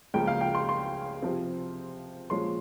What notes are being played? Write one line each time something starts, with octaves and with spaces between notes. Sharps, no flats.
C#2 C#3 F3 A#3 G5
F5
G5
C6
C6
C3 F3 C4
A#2 F3 G#3 C#4 C6